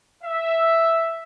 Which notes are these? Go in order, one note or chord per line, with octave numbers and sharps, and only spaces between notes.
E5